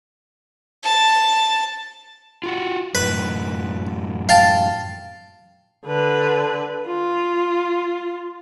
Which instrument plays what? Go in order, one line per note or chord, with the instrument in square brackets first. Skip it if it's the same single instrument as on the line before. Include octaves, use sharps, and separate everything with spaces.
[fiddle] A5
[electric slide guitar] F4 F#4
[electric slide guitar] F#2 A2 [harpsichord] B4
[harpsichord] F5 G5 A5
[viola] D3 B4
F4